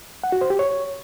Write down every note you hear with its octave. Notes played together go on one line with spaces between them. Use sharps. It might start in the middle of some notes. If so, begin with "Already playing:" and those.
F#5
F#4
C5
G4
C#5